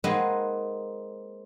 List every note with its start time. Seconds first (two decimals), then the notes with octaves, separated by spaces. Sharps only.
0.04 G#3 A#3 C4 D#4 B4 F#5